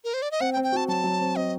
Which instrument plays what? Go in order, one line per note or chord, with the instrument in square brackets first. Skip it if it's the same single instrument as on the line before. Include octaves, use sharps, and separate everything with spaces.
[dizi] A#4
C5
D5
D#5
[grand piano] C4 [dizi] F#5
[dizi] G5
[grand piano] C4
[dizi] G5
[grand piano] F#4 [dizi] A5
[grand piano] F#3 [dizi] A5
[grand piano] F#3
C4
[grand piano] C4 [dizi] D#5